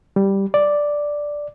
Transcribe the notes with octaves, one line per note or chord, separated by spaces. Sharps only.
G3
D5